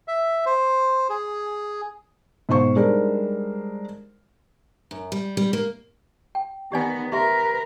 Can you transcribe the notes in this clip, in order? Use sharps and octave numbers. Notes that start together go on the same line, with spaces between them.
E5
C5
G#4
G#2 B2 C5 C#6
G3 G#3 D4 D#4 A#4 C5
F#2
G3
G3
A#3
G5
D#3 B3 G4 D5 G#5
G4 A#4 B4 E5 C6